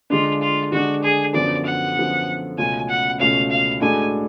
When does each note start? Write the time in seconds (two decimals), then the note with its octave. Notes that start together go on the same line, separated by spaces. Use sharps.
0.10 D3 G#3 D4 F4
0.41 F4
0.72 D3 G#3 D4 F#4
1.03 G#4
1.34 F#2 D3 F3 B3 F#4 D5
1.65 F#5
1.96 F#2 D3 F3 B3 F#4
2.58 C#2 B2 A3 C#4 F4 G#5
2.89 F#5
3.20 C#2 B2 A3 C#4 F4 F5
3.50 F5
3.81 A2 G#3 D4 F#4 A4 G#5